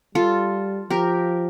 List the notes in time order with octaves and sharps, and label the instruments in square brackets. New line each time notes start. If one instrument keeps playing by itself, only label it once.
[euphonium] G3 [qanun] F4 A4
[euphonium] F3 [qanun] G4 A#4